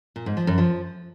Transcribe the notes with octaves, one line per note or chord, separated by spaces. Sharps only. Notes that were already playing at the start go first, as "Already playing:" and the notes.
A#2
G#2
F3
F#2
F3